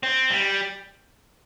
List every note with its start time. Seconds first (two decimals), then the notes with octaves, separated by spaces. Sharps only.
0.03 C4
0.30 G3